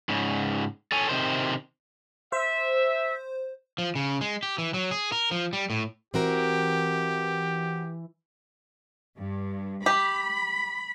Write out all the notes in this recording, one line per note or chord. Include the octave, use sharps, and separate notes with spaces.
G#2 C#3
A4 C#5 G#5
C3 D#3 C5
C5 E5
F3
C#3
G#3
G4
E3
F#3
G#4
A#4
F3
G3
A2
E3 C4 F#4 G4 A#4
G2
G4 B5